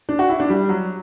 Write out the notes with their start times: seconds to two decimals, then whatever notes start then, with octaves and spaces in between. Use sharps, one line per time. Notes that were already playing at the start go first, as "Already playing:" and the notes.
0.09 D4
0.19 F#4
0.29 E4
0.40 D4
0.49 G3
0.69 F#3